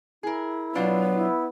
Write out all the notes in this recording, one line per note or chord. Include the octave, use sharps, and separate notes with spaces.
E4 G#4 A#4
B2 F#3 B3 D4 F4
E4